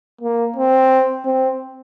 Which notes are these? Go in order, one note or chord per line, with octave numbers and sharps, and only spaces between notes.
A#3
C4
C4